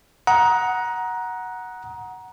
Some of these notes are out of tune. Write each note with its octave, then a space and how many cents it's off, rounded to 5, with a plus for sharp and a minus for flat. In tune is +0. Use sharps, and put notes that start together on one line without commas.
F#5 +0 A#5 +20 D#6 +20